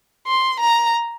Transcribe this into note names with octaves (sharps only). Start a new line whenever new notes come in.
C6
A#5